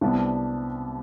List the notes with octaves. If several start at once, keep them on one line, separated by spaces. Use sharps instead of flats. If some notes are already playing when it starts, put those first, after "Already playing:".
C2 C3 G3 B3 D4